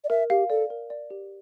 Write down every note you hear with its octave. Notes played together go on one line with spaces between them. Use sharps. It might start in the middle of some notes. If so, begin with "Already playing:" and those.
D5
A#4 E5
G4 F5
A4 D5
A#4
D5
G4